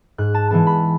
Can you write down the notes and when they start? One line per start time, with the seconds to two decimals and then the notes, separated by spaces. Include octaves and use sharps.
0.18 G#2 F#6
0.34 A5
0.50 E3 G#3 B3 A5
0.67 B5